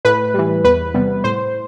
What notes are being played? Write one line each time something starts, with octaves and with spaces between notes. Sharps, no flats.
A2 B4
E3 G3
E2 B4
C3 G3 B3
A2 C5